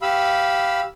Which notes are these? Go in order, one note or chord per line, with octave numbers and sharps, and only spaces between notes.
G4 F5 B5 E6